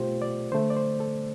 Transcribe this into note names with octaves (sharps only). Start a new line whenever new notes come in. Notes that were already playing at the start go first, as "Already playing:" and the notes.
Already playing: B2 A3 F4 G4 C5
D5
D3 A3 C5
D5
C5
A4